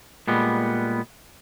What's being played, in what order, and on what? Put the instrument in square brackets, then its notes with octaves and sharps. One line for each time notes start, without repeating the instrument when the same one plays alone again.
[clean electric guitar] A#2 G3 G#3 B3